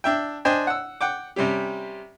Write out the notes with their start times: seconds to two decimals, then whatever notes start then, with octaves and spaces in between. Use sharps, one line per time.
0.04 D4 E5 G5
0.45 D4 C5 D#5 G5 G#5
0.67 F#5 E6
1.01 F#5 G5 D6
1.36 C3 G3 C#4 G4